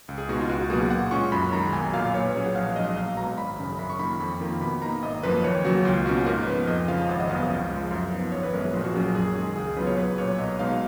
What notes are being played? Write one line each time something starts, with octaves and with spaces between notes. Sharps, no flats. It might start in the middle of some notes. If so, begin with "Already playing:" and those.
C#2
G#4
B2 G#3 D#4 F#4
F4
C#2 F#4
B2 F#3 A#3 G#4
A#2 F#5
G#3 C#4 F4 C#6
F#2 B5
D#3 G#3 A#5
B1 G#5
A#2 F#3 F5
A#2 C#5
B4
F#3 C#4 G#4
F#5
A#1 F5
G#2 F#3 D#5
B1 F5
B2 G#3 A#5
G#1 B5
F#2 C#3
F#2 B5
C#6
D#3 A#3 F4 B5
F2 B5
D#3 A#3 F4
B2 B5
A#3 D#4 A#5
G#1 D#5
F#2 F3 A#3 B4
D#2 C#5
C#3 F#3 A#3 F#4
C#2 F4
B2 A#3 C#4 F#4
G#2 A#4
F3 B3 B4
F2 D#5
C#3 F3 F5
G#1 F#5
D#5
F#2 C#3 F3 B3 F5
C#2
C#3 F3 G#3
F#2
F3 B3 D#4
G#1 C#5
B4
F#2 F3 G#3 B3 A#4
G#4
A#1 F4
F#4
A#2 F#3 C#4 G#4
A#4
F#2 G#4
D#3 G#3 G#4
C#2 G#4
C#3 F#3 B3 F4 B4
C#5
B1 B4
A#2 F#3 C#5
B1 D#5
B2 G#3 D#4 F5